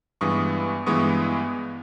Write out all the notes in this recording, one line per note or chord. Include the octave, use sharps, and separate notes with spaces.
G2 E3 G#3 B3 C#6 D#6
G2 E3 G#3 B3 C#6 D#6